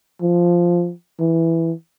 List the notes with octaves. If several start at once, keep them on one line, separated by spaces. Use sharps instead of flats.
F3
E3